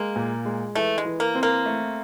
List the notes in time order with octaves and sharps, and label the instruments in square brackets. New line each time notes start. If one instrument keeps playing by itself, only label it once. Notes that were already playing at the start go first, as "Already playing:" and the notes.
Already playing: [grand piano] G#3 [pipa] A#3
[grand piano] A#2
G#3
[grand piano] E3 [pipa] A3
[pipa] G#3
[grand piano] E3
[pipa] A#3
[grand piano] C4
[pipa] A#3
[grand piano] A3